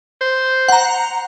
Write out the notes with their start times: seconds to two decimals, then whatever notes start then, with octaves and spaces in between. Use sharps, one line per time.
0.21 C5
0.68 F#5 A#5